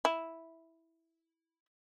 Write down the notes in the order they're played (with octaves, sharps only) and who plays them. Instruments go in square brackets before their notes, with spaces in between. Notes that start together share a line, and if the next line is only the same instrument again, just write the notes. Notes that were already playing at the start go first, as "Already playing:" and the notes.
[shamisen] E4